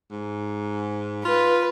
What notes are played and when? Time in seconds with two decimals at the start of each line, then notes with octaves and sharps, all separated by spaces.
0.11 G#2
1.25 F4 B4